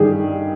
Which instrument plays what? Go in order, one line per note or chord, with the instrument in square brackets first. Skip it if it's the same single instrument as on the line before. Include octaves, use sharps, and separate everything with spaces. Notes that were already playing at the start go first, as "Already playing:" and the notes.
Already playing: [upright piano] G2 D#3 G3 G4 G#4